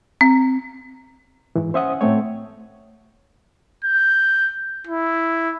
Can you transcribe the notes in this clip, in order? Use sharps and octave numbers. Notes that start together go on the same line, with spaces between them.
C4
G#2 E3
C#4 C5 E5 F#5 D#6
A2 A3 C4 C#5
G6
E4